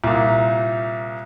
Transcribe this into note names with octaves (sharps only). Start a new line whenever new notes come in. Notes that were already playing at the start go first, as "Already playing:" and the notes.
C2 A#2